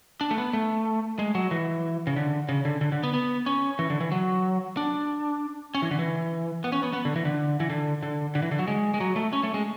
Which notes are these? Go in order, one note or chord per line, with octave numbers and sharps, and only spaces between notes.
D4
A3
B3
A3
G#3
F#3
E3
C#3
D3
C#3
D3
D3
D3
B3
B3
C#4
E3
D3
E3
F#3
D4
C#4
E3
D3
E3
B3
C#4
B3
B3
D3
E3
D3
E3
D3
D3
D3
E3
D3
F#3
G#3
G#3
F#3
A3
C#4
A3
G#3